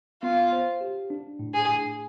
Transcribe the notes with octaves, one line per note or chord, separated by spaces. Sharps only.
B3 F4
C5
G4
D4
A2
G#4
A2